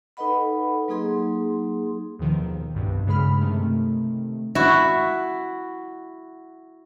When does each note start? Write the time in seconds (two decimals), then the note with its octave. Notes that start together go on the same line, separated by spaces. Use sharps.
0.17 D#4 A4 B4 D#5 F#5 B5
0.88 F#3 A#3 D#4 G#4 C6
2.19 D#2 B2 D#3 F3
2.74 C2 G2 B2
3.07 G2 C#3 G#3 G#4 B5 F6
3.42 C3 D#3 A3
4.55 E4 F#4 E5